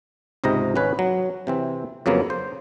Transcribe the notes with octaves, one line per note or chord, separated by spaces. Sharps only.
C#2 G#2 C3 D#5 A#5
G#1 C#4 B4 C#5
F#3
C3 E3 C4
F2 C#3 F#3 A#3 B3
C5